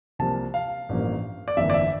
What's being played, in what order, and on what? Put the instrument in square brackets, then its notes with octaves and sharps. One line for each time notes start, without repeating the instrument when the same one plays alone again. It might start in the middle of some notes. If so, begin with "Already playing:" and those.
[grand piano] C2 C3 F3 A#3 A5
F5
A1 G2 F3 A#3
D5
G1 F2 E3 A#3 E5
D5
E5